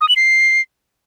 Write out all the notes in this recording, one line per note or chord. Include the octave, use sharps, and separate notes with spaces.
D#6
F#7
C7